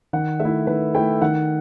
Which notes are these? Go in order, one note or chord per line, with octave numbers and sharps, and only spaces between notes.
D#3 F#5
A3 E5
E4
D#3 B4
A3 E4 G5
D#3 F#5